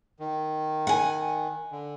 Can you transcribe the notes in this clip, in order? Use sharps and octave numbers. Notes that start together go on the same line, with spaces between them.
D#3
F#5 G#5
D3